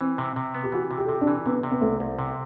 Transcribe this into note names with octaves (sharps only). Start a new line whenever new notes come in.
E3 C4
C3
C3
B3
G4
E3 F#4
C3
G4
A4
C3 G4
D4
E3
C3 B3
C3
B3
C2 A3
C2
C3